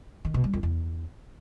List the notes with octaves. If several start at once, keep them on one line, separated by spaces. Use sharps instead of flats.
D#3
B2
G3
F2
E2